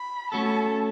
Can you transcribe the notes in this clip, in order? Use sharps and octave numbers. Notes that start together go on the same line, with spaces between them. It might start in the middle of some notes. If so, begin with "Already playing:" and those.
Already playing: B5
A3 C#4 F#4 A4 A5